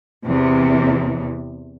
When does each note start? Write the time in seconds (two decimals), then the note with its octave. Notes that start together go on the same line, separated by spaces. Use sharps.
0.24 E2 C3